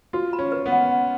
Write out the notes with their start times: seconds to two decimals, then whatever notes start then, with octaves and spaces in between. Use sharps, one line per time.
0.13 F4 F#4
0.33 B5
0.39 C#4
0.52 B4
0.66 B3
0.72 F#5
0.91 F#5